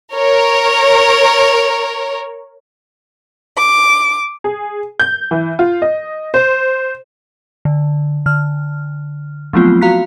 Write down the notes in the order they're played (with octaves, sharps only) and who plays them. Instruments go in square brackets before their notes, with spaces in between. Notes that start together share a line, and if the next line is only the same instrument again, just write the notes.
[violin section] A#4 C#5
[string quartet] D6
[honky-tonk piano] G#4
G6
E3
F4
D#5
C5
[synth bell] D3
D3 F6
F3 F#3 A3 B3 C4 F4
F#4 F5 A#5 F#6 B6